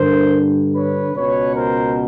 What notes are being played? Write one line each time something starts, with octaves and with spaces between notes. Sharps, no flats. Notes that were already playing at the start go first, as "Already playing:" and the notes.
Already playing: G2 D3 A#4 C5
B4 C#5
C#2 B2 B4 C#5
A#4 C5